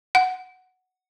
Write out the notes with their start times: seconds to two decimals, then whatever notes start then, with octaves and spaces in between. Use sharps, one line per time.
0.15 F#5